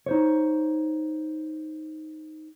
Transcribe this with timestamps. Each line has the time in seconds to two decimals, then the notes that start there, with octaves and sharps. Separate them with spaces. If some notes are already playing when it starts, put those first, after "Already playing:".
0.06 D#4 C5 C#5